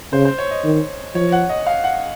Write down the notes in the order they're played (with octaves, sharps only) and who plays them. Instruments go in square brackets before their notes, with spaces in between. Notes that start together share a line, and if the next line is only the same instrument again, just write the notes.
[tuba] C#3 [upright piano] C5
[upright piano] C5
C#5
D#5
[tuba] D#3
[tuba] F3 [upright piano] C#5
[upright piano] F#5
D#5
F5
F#5